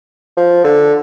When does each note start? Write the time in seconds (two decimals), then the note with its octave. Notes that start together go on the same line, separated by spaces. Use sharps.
0.37 F3
0.64 D3